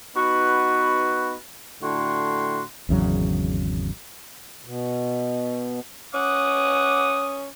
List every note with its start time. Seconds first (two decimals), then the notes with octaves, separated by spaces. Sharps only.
0.16 B3 D#4 F#4 B4
1.82 A2 D3 F#4 C6
2.89 G#1 E2 C#3 F#3
4.65 B2
6.14 C#4 F#5 D6 D#6